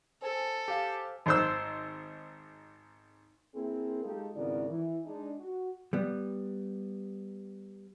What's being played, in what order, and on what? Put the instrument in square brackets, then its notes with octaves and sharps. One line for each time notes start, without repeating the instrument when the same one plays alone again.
[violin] A4 [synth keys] C5 G#5
[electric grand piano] G4 F5
[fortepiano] G#1 C5 E6
[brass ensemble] A#3 C4 E4 G#4 A#4
G#3 D#4 F4 G4 A4
G#1 C#3 B3 E4 A#4 D5
E3
G#3 D4 D#4
F#4
[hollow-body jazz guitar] G3 B3